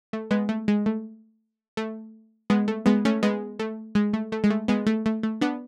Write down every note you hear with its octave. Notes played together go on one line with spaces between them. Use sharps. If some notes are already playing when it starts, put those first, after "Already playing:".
A3
G#3 B3
A3
G#3
A3
A3
G#3 B3
A3
G#3 B3
A3 C#4
G#3 B3
A3
G#3
A3
A3
G#3
A3
G#3 B3
A3
A3
A3
B3 D4